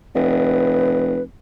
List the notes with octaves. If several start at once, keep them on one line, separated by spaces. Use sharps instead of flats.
F1 B4